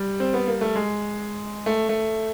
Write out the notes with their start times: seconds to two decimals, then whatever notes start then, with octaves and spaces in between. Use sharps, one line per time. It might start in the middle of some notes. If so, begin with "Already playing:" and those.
Already playing: G3
0.20 C4
0.34 B3
0.47 A#3
0.61 A3
0.75 G#3
1.66 A3
1.89 A3